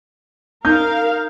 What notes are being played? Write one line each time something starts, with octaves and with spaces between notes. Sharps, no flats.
D#4 A#4 F5 G6